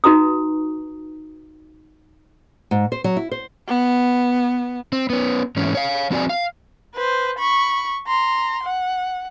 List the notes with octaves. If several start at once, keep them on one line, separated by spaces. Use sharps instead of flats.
D#4 F#4 B4 A#5 D#6
G#2
C5
F#3
E4
C5
B3
C4
B3 C#4
G#2 E3 C#4
C#5 F5
F3 C4 F#4 D5 G#5
F5
B4 C5
B5 C#6
A#5 C6
F#5